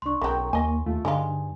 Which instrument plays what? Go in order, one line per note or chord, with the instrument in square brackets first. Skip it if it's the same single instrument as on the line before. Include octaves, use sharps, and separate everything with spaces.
[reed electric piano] C2 D4 [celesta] C6 C#6
[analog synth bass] B1 [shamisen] C#3 F#3 [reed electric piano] A#4 G5
[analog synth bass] D#2 [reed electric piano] A#3 [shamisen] D#5 G#5
[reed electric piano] D#2 F4 [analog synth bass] A3
[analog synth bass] G2 [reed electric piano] D3 [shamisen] D#3 G#3 F4 [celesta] G#5